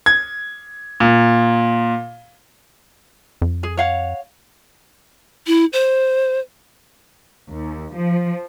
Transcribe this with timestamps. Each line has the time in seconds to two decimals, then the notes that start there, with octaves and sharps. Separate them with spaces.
0.06 G#6
1.00 A#2
3.41 F2
3.63 G#4
3.77 C#5 F5 F#5
5.47 E4
5.73 C5
7.50 D#2
7.95 F3